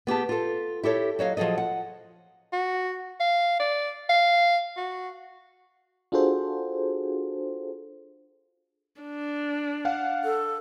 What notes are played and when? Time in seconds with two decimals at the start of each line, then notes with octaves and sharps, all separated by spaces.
0.07 B3 G4 G#4 A5
0.29 F4 A4
0.83 E4 G4 A4 C#5
1.19 F#3 C#5 D#5 F5
1.37 F3 F#3 G#4 A4 D#5
1.58 F#5
2.53 F#4
3.20 F5
3.60 D5
4.09 F5
4.77 F#4
6.12 D4 F4 F#4 G#4 A4 C5
9.01 D4
9.85 F5 F#5
10.25 A4